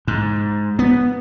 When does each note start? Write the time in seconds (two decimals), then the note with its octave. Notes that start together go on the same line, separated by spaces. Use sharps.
0.07 G#2
0.79 B3